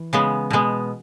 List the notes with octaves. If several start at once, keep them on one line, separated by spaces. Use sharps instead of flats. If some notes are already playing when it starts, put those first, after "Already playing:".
Already playing: E3
C#3 G#3 B3
B2 G#3 B3